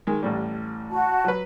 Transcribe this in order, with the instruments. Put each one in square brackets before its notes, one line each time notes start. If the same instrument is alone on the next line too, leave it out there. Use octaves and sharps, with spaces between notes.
[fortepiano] D#3 G#3
A1 A2 G3
[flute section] F#4 A5
[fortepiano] F#3 B4